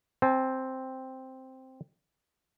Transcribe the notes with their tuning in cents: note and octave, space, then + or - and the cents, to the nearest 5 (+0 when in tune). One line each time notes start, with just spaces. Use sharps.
C4 +0 A5 -45